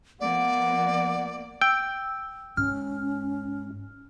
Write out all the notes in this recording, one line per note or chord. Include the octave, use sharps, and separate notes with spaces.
F3 A#3 B3 D5 F#5
G5 E6
G#2 C#4 F6